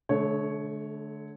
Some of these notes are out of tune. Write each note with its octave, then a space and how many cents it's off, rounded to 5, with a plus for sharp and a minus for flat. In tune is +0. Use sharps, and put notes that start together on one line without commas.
D3 +0 A3 -40 C#5 +0